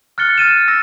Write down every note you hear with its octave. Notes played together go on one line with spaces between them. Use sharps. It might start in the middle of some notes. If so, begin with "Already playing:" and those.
F6 F#6 A6 C#7 G7
F6 A6 D#7 E7
E6 A#6